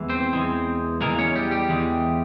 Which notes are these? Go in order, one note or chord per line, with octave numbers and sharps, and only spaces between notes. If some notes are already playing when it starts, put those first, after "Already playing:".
Already playing: E2 E3 G#3
C4 C5
E2 E3 G#3
E2 E3 G#3 A#3 A#4
C#4 C#5
G3 G4
G3 G4
E2 E3 G#3